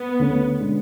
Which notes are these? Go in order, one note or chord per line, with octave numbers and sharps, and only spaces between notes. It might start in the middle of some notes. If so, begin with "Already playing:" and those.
Already playing: B3
D2 D3 A3 C#4
B2 G#3 B3 D4